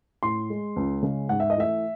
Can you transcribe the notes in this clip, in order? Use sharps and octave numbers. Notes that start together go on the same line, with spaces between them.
A2 C6
G#3
C#2
C#3 G#3
G#2 F#5
E5
D#5
E3 A3 E5